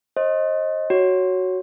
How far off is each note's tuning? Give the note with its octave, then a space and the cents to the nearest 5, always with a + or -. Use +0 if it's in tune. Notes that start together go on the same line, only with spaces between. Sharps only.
C5 +35 D#5 +10
F#4 +0 C#5 +0